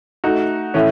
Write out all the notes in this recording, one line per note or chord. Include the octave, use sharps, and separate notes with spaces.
A3 D#4 F#4
A2 E3 A3 C#4